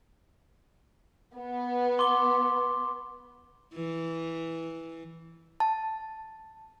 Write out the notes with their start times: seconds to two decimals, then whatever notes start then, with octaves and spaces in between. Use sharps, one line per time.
1.37 B3
1.99 C6 D6 G7
3.74 E3
5.60 A5